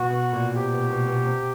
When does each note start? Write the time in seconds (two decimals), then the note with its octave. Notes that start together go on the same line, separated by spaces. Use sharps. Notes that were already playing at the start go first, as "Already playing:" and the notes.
Already playing: B2 F#4
0.10 B2
0.33 A#2
0.56 C3 G4
0.73 B2
0.90 B2
1.07 B2
1.25 C3